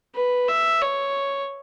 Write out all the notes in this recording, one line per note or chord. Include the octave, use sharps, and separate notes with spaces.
B4
E5
C#5